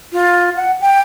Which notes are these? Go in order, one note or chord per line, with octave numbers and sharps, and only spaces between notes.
F4
F#5
G5